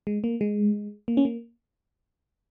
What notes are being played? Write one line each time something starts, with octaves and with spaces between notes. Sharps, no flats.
G#3
A#3
G#3
A#3
C#4
A#3